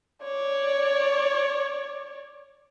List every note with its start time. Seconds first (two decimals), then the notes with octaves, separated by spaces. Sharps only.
0.23 C#5 D5